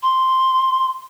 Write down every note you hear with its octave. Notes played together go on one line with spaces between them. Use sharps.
C6